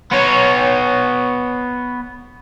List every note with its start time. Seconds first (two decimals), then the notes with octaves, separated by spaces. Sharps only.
0.11 B3 C#5